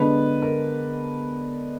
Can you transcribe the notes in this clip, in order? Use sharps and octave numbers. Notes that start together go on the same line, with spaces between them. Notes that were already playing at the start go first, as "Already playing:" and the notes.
Already playing: D3 G#3 B3 D4 B4
A#4